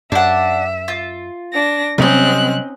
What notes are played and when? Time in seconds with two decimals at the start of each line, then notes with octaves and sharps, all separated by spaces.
0.12 F#2 D4 E5 F#5
0.88 F4
1.53 D4 A#6
1.98 C3 F#3 G3 C4 C#4 D#4 D#5 F#6